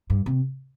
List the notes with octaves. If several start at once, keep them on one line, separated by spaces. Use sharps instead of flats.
G2
C3